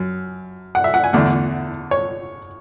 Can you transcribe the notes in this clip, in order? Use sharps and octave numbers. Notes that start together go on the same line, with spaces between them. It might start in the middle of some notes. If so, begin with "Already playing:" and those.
Already playing: F#2
F#5
E5
F#5
G#5
E2 D3 A3 F#5
C#5